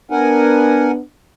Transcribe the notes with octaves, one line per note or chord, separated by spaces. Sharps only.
B3 D4 A#4 F#5 G#5